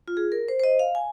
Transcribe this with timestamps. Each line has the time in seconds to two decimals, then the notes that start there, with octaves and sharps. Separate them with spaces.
0.08 F4
0.17 G#4
0.32 A#4
0.48 C5
0.60 C5
0.64 D#5
0.79 F5
0.95 G#5